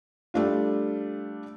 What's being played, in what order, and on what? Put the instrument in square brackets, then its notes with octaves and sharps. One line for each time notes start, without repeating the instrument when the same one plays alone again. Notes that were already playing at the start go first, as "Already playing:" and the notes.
[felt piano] G3 A3 D4 F4